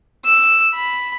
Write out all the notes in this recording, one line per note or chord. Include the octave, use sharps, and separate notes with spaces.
E6
B5